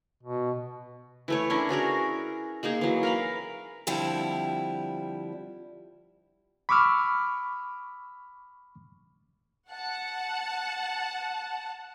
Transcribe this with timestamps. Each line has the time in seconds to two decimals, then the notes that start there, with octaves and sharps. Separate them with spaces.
0.23 B2
1.28 E3 A3 C#5
1.50 C#4 D4 E4 A#4
1.69 C#4 F#4 G#4 A#4
2.63 G#3 A#3 D#4 G#4
2.81 E3 F#3
3.03 A#4 F5 B5
3.87 D3 F3 G3 C4 E4
6.69 B5 C#6 D6 E6 F6
9.70 F#5 A5